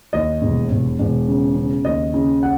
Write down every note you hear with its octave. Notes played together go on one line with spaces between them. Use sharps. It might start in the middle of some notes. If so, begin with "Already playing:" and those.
D#2 D#5
E1
E1
E1
C#3
C#3
D#2 D#5
C#3
F#5